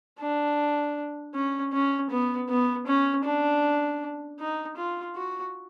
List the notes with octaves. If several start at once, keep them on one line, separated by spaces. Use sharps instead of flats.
D4
C#4
C#4
B3
B3
C#4
D4
D#4
F4
F#4